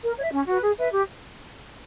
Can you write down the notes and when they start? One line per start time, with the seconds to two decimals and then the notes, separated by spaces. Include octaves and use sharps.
0.03 A#4
0.17 C#5
0.22 E5
0.32 C#4
0.47 F#4 B4
0.61 G#4
0.77 B4 E5
0.92 G4